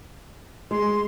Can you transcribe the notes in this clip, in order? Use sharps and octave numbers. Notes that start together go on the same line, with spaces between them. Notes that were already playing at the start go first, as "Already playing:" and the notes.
G#3 C6